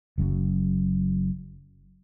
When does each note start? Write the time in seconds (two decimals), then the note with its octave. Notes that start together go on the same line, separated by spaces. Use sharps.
0.18 F#1 F#2 B2 F#3